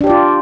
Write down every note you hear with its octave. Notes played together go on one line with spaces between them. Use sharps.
D4 F4 G4 D5